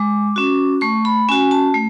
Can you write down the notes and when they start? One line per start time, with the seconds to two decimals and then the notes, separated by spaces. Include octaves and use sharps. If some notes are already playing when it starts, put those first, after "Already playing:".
Already playing: G#3 D6
0.36 C#4 F#4
0.81 A3 C#6
1.05 B5
1.29 C#4 F#4 G#5
1.51 A5
1.74 A3